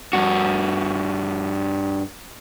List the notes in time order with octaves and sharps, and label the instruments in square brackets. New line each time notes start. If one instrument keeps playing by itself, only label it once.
[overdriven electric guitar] G2 F#4